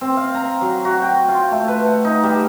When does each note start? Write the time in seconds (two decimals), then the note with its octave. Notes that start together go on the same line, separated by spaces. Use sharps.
0.01 C4
0.17 F5
0.35 A#5
0.61 F#3
0.85 F#4
1.02 G5
1.28 F4
1.52 A3
1.68 B4
1.86 F#5
2.05 D#4
2.23 G3